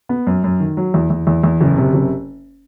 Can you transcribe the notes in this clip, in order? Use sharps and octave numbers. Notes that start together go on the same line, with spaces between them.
B3
F#2
F#2
D#3
F#3
E2
E2
E2
E2
F#1
C3
F#1